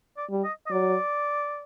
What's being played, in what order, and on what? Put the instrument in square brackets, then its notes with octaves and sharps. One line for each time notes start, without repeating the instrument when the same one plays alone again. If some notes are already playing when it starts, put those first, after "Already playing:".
[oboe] D5
[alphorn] G3
[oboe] D#5
D#5
[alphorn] F#3 [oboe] D5